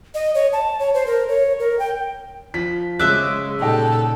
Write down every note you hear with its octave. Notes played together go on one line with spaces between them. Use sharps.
D#5
C#5
A5
C#5
C5
A#4
C#5
A#4
G5
F3 B6
C#3 G#3 E5 D6 E6 F#6 B6
A#2 D#4 G4 A4